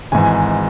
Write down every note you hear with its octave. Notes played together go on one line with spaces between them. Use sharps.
G#1 G#2 E3 G#5